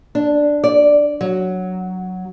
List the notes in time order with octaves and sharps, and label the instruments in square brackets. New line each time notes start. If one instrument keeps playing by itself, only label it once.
[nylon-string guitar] D4
D5
F#3